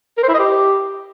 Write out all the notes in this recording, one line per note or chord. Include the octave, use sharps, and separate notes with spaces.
A#4
C5
E4
D#5
G4